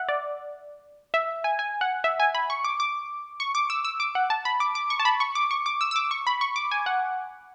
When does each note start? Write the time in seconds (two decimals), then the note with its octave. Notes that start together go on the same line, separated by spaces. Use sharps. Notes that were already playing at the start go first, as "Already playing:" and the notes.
Already playing: E5 F#5
0.09 D5
1.14 E5
1.44 G#5
1.59 G#5
1.81 F#5
2.04 E5
2.20 G#5
2.35 B5
2.50 C#6
2.64 D6
2.80 D6
3.40 C#6
3.55 D6
3.70 E6
3.85 E6
4.00 D6
4.15 F#5
4.30 A5
4.45 B5
4.60 D6
4.75 D6
4.90 C#6
5.00 A5
5.05 B5
5.20 C#6
5.35 D6
5.51 C#6
5.66 D6
5.81 E6
5.91 E6
5.96 D6
6.11 C#6
6.27 B5
6.41 C#6
6.56 D6
6.71 G#5
6.86 F#5